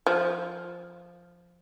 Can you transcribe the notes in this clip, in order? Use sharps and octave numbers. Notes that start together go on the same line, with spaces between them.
F3